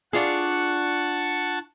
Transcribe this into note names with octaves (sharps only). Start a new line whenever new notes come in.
D4 F4 G#4 F#5 A5 C#6